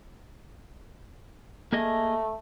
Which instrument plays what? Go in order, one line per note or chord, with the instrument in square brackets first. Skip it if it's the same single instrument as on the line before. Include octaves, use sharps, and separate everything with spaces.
[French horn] A3 [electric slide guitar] A#3 G#4 D#5